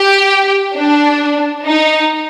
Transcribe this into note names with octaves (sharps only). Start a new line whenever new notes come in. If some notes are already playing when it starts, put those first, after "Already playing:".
Already playing: G4
D4
D#4